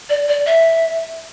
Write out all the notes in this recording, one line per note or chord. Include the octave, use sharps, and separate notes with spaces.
D5
D5
E5